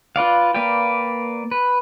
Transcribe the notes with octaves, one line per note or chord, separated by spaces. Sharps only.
F4 B4 D5 F5
A#3 B4 D5 F5 G5
B4